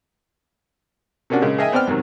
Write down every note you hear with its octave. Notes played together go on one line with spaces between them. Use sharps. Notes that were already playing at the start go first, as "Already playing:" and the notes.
C3 A#3 C#4 D4 F#4
A#2 C#3 G#3
G#4 A#4 D#5 E5 G5 G#5
B3 C4 D5 G5 F6
G#2 C3 D#3 F#3